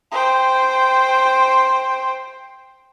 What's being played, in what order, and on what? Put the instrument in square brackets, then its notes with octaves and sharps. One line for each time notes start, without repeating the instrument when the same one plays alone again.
[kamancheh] C5 G5